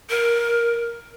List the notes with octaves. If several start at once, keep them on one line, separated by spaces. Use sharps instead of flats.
A#4